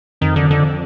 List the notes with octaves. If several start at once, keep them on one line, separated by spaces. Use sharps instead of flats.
F2 D#3
D3
D3